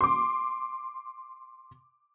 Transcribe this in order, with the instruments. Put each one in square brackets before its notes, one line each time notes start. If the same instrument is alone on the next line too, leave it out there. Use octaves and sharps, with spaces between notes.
[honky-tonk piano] C6 D6